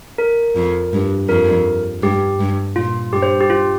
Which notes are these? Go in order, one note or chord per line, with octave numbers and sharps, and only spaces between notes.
A#4
F2
G2
F2 A#4
G2 G4
G2
A#2 F4
G2 G4
C5
G4
F4